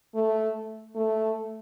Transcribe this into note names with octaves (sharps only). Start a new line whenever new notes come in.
A3
A3